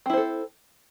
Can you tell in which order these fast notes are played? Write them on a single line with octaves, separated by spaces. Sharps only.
C4 E4 C5 A4